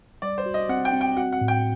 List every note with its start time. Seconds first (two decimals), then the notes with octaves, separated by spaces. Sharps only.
0.22 G3 D5
0.38 C5
0.46 F#4
0.54 D#5
0.69 C4 F#5
0.85 G5
0.93 C4
1.01 G5
1.17 F#4 F#5
1.33 F#5
1.41 A2
1.48 G5